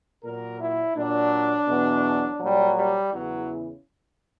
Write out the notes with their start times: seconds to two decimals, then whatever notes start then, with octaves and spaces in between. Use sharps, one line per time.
0.24 A#2 F#3 A#4
0.60 E4
0.96 A#2 F#3 D4
1.68 E2 B2 F#3
2.40 A#2 F#3 G3
2.76 G3
3.12 E2 C#3 E3 F#3